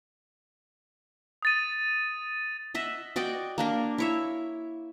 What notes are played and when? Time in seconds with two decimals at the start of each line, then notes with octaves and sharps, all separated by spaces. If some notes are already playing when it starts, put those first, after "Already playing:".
1.42 D#6 A6 D#7
2.74 D#5 E5 F#5
3.16 F#4 D5 D#5 G5
3.58 A#3 D4 A#4
3.98 E4 C#5 E5